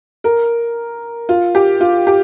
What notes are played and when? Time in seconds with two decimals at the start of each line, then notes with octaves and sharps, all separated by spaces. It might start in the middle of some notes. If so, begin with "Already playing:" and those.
0.24 A#4
1.29 F4
1.55 G4
1.81 F4
2.07 G4